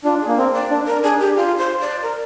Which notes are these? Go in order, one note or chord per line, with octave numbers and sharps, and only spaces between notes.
D4 F4
G#4
A#3
C4 A#4
D5
D4
A#4
D4 G#4
G4
F4
C5
D5
A#4